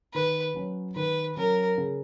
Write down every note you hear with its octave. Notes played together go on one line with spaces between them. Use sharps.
D#3 B4
F#3 C#4
D#3 B4
F#3 C#4 A#4
C#3